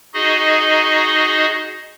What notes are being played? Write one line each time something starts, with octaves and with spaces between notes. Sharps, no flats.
D#4 F#4 G#4 D#5